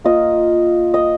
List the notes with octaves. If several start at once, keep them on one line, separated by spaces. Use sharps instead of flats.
A#3 F4 D#5
D#5